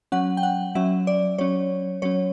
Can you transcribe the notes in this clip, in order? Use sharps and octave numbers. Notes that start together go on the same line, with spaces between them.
F#3 C#4 F#5
G5
F#5
F#3 C#4 E5
D5
F#3 C#4 C#5
F#3 C#4 C#5